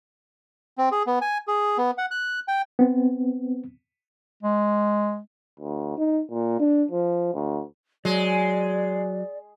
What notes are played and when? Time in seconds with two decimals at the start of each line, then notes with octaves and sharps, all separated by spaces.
0.78 C4
0.92 G#4
1.07 B3
1.21 G#5
1.48 G#4
1.78 B3
1.98 F#5
2.11 F#6
2.48 G5
2.79 B3 C4
4.43 G#3
5.60 D2
5.98 D#4
6.31 A#2
6.60 D4
6.91 F3
7.34 D2
8.05 F#3 G#3 D5